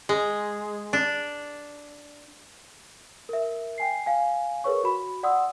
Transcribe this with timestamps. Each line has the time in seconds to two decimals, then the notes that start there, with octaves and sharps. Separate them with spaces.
0.09 G#3
0.93 D4
3.29 A#4 E5
3.78 G5 G#5 C7
4.06 F5 G#5
4.64 G#4 A#4 B4 C#5 C#6
4.84 F#4 B5
5.23 D5 F#5 C6 D#6 E6